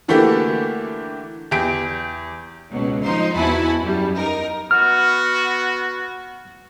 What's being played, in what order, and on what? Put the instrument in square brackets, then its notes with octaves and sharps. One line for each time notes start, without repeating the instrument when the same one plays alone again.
[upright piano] D3 E3 A3 A#3 F#4 G4
E2 G4 D7
[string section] C#2 B2 F#3
F3 D#4 C5 A#5 C6
E2 E4 F#4 G#5 A5 B5
F#2 G3
D#4 A#4
[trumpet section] B3 F#4 [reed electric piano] F6